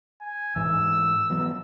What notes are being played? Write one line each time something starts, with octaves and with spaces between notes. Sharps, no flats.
G#5
G#2 E3 E6
E3 F#3 B3